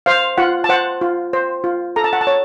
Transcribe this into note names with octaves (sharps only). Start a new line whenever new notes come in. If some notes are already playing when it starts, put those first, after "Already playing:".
C5 F5
F4 F#5
A5
C5 F#5
F4
C5
F4
A4 A#5
A5
F#5
A5
C#5